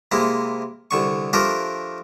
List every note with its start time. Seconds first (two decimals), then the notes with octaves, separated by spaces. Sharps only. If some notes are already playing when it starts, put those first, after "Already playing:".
0.12 C3 G#3 A#3 E4
0.91 C2 D3 C#6
1.33 F3 A3 D4 G4 A#4